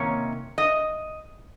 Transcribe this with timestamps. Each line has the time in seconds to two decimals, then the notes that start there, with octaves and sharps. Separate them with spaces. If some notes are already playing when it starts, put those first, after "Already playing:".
Already playing: C3 D#3 A#3 C#4 C#5
0.58 D#5